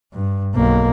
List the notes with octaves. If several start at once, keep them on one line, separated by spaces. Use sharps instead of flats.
G2
B1 A#3